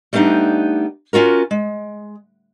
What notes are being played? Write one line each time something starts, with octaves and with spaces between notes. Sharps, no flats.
G3 A3 B3 D4 D#4
C#4 F4 F#4 A#4
G#3